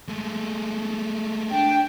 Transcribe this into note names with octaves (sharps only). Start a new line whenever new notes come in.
G#3 A3
D4 G5